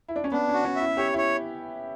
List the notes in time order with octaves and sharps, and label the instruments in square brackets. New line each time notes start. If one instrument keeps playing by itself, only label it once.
[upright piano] E4
D4
C#4
[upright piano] B3 [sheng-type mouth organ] D4
[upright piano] C#4 [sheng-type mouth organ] F#4
[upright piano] C#4
[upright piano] E4 [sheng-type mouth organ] E5
[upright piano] G4 [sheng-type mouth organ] C#5
[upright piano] E4 [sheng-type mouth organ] C#5